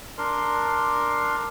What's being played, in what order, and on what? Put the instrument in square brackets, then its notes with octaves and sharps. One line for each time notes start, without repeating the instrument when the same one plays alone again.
[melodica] D4 A#4 C6